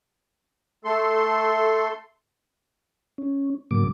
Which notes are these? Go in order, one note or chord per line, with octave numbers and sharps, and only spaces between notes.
A3 A4 C6
C#4
G#2 C#3 F#3 A#3 D6